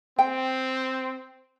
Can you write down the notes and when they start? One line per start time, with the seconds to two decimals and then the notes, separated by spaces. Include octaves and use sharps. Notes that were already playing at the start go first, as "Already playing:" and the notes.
0.19 C4 G5